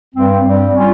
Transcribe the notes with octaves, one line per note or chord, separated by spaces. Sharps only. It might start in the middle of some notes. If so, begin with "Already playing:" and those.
G2 G3 C4
G2 G3 C4
G3 C#4 F4